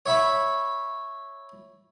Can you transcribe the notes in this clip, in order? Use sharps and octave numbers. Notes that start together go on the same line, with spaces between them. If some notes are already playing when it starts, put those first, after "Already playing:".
C#5 E5 B5